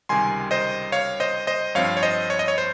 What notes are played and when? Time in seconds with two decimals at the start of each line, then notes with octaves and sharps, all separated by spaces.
0.09 C#2 C3 D#3 G3 G#5 C6
0.51 C5 D#5
0.92 C#5 F5
1.20 C5 D#5
1.47 C5 D#5
1.75 G2 F3 C4 C#5 F5
1.97 C#5
2.03 C5 D#5
2.30 C#5
2.39 D#5
2.48 C#5
2.58 C5